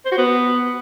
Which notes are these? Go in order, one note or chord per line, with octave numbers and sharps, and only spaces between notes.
C5
F#4
B3